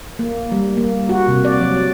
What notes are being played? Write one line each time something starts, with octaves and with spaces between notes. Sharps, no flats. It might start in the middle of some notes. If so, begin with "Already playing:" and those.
A#3
G3
A#3
F#4
C3
D5
F#3